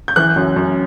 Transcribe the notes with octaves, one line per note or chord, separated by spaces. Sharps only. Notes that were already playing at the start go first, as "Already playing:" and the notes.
G6
E3 F#6
F#2
F#2